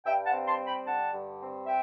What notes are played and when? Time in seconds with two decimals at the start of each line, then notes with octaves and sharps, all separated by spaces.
0.05 G2 E5 G5
0.26 F#5 A5
0.32 C4
0.46 A5 C6
0.60 G3
0.66 G5 B5
0.86 D3 F#5 A5
1.13 G2
1.40 C4
1.66 E5 G5